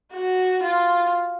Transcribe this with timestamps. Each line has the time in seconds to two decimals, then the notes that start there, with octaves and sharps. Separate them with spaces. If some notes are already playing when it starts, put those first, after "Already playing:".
0.13 F#4
0.63 F4